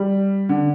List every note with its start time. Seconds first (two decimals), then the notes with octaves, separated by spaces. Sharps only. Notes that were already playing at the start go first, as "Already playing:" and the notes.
Already playing: G3
0.49 D3